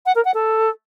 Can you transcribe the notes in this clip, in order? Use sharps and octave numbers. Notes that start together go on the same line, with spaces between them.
F#5
A#4
F#5
A4